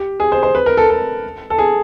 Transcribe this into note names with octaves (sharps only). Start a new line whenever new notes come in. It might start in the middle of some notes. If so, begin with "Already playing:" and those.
Already playing: G4
G#4
C5
C5
B4
A#4
A4
A4
A4
G#4